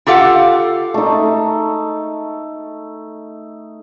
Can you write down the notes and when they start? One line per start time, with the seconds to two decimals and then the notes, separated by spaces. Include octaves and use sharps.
0.07 F4 G4 A4 F5 F#5
0.94 A3 D#4